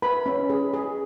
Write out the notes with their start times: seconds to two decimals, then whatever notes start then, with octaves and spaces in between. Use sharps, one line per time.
0.02 B4 B5
0.26 C#4
0.50 G#4
0.74 G#4